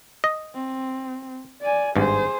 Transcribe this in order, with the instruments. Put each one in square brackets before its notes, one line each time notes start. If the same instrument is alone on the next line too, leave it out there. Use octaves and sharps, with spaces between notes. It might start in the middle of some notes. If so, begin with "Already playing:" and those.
[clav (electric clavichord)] D#5
[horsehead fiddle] C4
D5 G#5
[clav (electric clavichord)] G#1 G2 [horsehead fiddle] G#4 C5